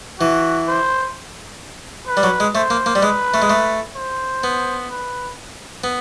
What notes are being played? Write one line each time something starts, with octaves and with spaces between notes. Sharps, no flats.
E3 F#4
C5
B4
G3
F#3
G#3
A3 C5
A#3
A#3
G3
G#3 B4
A3
G#3
A3
C5
B3
B4
B3